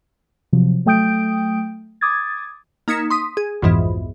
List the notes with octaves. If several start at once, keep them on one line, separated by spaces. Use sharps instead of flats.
C3 F3 F#3
F#3 A3 G5 D#6 G6 D7
D6 D#6 G#6 A6
A#3 D#4 G#6 B6 C#7 E7
C6 D#6 B6
G#4
B1 F2 G#2 E3